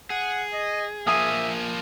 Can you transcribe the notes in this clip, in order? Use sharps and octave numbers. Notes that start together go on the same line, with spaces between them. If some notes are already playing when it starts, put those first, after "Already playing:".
G#4 F#5
D#5
F3 A#3 E5 G#5 D#6